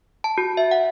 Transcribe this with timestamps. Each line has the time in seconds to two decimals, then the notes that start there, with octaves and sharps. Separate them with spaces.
0.24 A5
0.38 F#4
0.57 E5
0.71 F#5